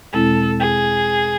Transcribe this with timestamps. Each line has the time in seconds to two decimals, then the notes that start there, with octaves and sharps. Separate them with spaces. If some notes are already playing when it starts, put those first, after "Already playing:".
0.13 E2 B2 G#3 C4 E4 A4
0.60 G#4